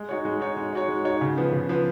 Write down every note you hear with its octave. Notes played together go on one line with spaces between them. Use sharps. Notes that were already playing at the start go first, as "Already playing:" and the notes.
Already playing: G#3
D#4 F#4 C#5
G#3
D#4 F#4 C#5
G#3
D#4 F#4 C#5
G#3
D#4 F#4 C#5
C#3
F3 B3
C#3
F3 B3